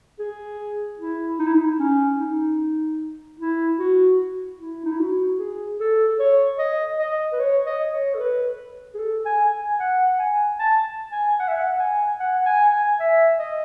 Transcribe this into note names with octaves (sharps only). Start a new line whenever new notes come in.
G#4
E4
D#4
E4
D#4
C#4
D#4
E4
F#4
E4
D#4
E4
F#4
G#4
A4
C#5
D#5
D#5
B4
C#5
D#5
C#5
A4
B4
G#4
A4
G#5
G#5
F#5
G#5
A5
G#5
F#5
E5
F#5
G#5
F#5
G#5
G#5
E5
D#5